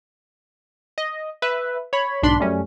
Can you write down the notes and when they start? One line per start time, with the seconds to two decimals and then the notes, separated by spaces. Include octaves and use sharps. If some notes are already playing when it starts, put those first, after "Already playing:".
0.98 D#5
1.42 B4 E5
1.93 C#5 B5
2.23 B1 G#2 D4 B5 C6
2.40 F#2 G3 A3 C#4